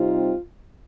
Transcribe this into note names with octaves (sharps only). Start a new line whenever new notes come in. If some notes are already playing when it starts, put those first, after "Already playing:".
Already playing: C3 G3 C4 D#4 F4